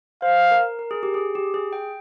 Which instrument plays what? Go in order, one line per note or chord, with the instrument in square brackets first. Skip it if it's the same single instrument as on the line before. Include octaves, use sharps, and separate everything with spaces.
[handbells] C5 [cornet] F5
[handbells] A#4
A#4
G#4
G4
G#4
G4
G#4
G5